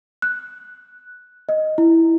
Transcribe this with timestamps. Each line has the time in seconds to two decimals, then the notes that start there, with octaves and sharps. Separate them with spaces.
0.22 F#6
1.49 D#5
1.78 E4